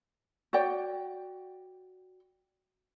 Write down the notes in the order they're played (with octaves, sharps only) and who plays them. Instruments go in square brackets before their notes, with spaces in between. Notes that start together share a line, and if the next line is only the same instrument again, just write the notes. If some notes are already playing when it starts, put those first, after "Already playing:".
[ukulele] F#4 C#5 D5 G5